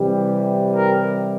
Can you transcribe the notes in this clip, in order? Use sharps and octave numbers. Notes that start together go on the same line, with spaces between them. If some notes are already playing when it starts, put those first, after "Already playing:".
Already playing: C3 E3 G3
A#4